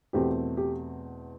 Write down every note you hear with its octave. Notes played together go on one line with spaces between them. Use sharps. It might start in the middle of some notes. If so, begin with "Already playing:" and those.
E2 B2 A3 C4 G4
G4